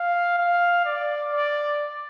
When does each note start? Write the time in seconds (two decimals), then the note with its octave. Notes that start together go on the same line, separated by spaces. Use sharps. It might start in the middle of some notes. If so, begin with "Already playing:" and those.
Already playing: F5
0.38 F5
0.85 D5
1.33 D5